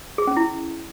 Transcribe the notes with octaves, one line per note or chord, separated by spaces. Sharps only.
G#4
C#4
E4